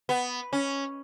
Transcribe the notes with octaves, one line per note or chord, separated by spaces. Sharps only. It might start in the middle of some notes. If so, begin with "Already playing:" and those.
B3
C#4